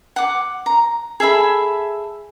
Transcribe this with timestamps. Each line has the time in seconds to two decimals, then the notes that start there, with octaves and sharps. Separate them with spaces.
0.16 F#5 D6
0.66 A#5
1.20 G#4 A4 E5 B5